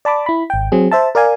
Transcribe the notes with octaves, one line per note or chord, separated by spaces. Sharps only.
D5 A5 B5 D6
E4 B5
G#1 G5
F#3 C4 G#4
C5 E5 A5
A#4 D5 F5 G#5